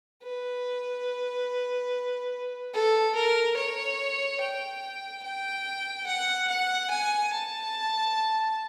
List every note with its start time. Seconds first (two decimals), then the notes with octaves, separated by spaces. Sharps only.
0.23 B4
2.74 A4
3.15 A#4
3.57 C#5
4.41 G5
5.24 G5
6.06 F#5
6.48 F#5
6.90 G#5
7.32 A5